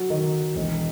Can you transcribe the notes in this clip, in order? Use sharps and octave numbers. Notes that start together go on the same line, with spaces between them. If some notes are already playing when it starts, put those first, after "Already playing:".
Already playing: F#3
D#3
E1